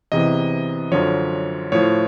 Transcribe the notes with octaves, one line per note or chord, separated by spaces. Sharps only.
E2 C3 E3 D#5
F#2 D3 F3 C#5
A2 F3 C#5